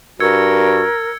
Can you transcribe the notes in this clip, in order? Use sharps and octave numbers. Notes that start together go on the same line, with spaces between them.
G2 F#4 A#4 E6 G#6 C#7